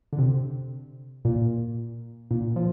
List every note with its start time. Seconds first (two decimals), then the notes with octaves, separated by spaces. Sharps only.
0.13 D3
0.18 C3
1.25 A#2
2.31 A#2
2.56 F3